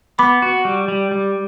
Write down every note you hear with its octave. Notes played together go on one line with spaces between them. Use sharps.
B3 B5 D6
F#4
G3
G3
G3